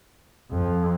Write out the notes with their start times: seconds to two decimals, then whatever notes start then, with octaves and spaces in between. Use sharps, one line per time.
0.51 F2